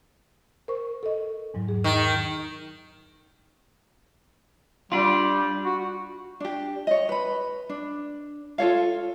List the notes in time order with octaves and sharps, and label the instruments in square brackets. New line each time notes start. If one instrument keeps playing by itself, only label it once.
[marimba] A#4 C5 C#6
A4 D#5
E2 G#2 F#3
G#4
[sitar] D#3
[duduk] G3 [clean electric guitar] D4 F4
[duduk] F#4
[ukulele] D4 G4
C#5 D#5
B4 B5
D4
F4 A4 C#5 F5